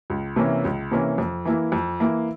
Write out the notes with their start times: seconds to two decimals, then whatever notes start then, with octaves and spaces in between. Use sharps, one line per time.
0.10 C#2
0.36 C3 E3 A#3 C#4
0.65 C#2
0.91 C3 E3 A#3 C#4
1.18 F2
1.45 E3 A#3 E4
1.72 F2
2.00 E3 A#3 E4